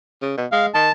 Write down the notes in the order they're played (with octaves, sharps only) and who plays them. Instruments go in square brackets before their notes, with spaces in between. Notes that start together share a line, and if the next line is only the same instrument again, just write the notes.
[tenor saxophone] C#3
B2
[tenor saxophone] G#3 [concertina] F5
[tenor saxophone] D#3 [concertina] A5